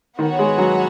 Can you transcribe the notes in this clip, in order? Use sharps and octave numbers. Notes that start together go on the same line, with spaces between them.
D#3 B3 F#4 C#5 F#5
G#3
F#3